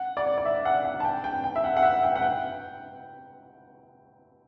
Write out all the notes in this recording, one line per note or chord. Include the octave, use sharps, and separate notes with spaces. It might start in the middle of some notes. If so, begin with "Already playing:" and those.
Already playing: F#5
D5
D5
E5
F#5
F#5
A5
G5
G5
G5
E5
F#5
F#5
E5
G5
F#5
G5